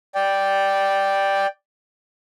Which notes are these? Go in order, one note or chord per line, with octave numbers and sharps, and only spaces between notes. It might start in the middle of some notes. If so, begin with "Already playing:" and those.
D5 G5